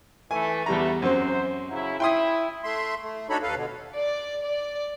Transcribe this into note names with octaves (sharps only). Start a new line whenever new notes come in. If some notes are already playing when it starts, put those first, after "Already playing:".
E3 A3 G#5
E2 D3 E3 G3 A3 A#5
F#2 F#3 C4 C5
C#3 F#3 E4
E4 G5 C6 D#6
A3 E5 C6
A3
D4 D#4 F#4 A4 C#5 B5
D#2 A4 B4 F5
B2 D3
D5
D5